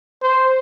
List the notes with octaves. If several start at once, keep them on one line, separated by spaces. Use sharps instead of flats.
C5